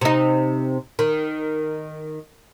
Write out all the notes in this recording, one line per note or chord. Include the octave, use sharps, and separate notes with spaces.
C3 D#4
D#3